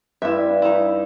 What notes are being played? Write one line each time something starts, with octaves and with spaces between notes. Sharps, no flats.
G2 E4 E5
D#4 E4